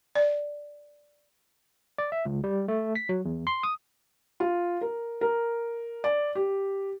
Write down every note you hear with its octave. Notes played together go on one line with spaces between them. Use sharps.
D5
D5
E5
C#2
G3
A3
B6
F#3
E2
C6
D#6
F4
A#4
A#4
D5
G4